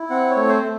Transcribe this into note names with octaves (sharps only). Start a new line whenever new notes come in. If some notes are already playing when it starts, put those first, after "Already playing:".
Already playing: E4
C4 F#5
C#5
A3
C5
A3